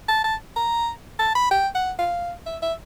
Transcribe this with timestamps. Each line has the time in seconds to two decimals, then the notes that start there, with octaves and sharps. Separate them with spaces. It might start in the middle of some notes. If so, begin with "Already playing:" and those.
0.08 A5
0.24 A5
0.56 A#5
1.19 A5
1.35 B5
1.51 G5
1.75 F#5
1.99 F5
2.46 E5
2.62 E5